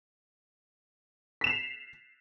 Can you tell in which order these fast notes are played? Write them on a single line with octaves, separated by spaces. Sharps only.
B6 E7 F7 C7